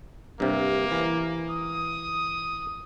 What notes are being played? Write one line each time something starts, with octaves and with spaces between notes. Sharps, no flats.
G2 C3 A#3
E3
D#6